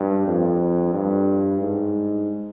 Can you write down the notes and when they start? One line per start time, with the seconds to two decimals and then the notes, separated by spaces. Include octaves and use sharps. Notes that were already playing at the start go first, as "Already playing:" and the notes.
Already playing: G2
0.27 F2
0.94 G2
1.61 G#2